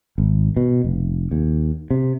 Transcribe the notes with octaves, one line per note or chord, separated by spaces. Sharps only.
G#1
B2
F1
D#2
C3